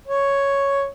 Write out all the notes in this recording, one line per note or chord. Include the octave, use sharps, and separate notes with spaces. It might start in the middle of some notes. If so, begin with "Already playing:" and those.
C#5